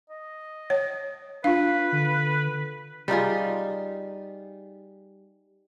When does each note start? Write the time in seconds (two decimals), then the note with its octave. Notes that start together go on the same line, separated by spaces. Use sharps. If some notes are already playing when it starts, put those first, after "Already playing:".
0.10 D#5
0.70 C#5
1.44 D4 F4 B4 F5
1.92 D3
3.08 G3 D#4 F4 G#4